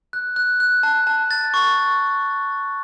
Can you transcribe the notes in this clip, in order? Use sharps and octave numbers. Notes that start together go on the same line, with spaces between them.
F#6
F#6
F#6
A5
A5
A6
C#6